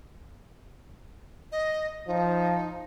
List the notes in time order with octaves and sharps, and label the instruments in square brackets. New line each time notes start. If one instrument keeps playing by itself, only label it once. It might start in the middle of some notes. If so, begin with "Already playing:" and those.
[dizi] D#5
[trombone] F3 [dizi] D#4